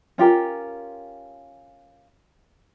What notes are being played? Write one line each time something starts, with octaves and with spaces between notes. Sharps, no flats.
C#4 F4 G4 A#4